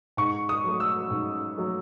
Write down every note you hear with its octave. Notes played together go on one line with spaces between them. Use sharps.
G#2 C#6
D#6
F#3 A3
E6
G#2
F#3 A3